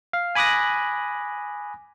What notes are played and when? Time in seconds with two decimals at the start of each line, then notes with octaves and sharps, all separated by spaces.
0.13 F5
0.35 G#5 B5 D6 D#6 F#6 A#6